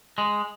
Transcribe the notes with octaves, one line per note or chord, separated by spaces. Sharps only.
G#3